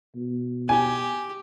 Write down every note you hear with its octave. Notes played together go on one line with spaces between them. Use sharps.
B2
G4 G#5